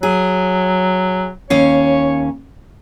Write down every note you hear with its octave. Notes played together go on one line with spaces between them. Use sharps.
F#3 G#4
D#2 C#4 C#5 F5